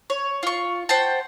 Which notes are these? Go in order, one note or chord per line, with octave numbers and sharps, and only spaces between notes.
C#5
F4 C#6
C5 F#5 G5 A5